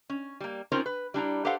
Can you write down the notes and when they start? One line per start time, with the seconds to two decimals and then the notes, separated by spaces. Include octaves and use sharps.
0.09 C#4
0.40 G3 A#3
0.72 C4 C#4 D#4 F4 A#4 C5
0.86 B4
1.14 G3 D4 E4 A#5
1.45 G4 A4 B4 C5 F5 F#5